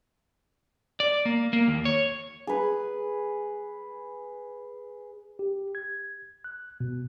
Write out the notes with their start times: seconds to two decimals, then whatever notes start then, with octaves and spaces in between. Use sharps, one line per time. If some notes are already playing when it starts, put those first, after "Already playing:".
1.00 D5
1.25 A#3
1.53 A#3
1.68 D#2
1.85 C#5
2.47 G#4 B4
5.39 G4
5.75 G#6
6.44 F#6
6.80 B2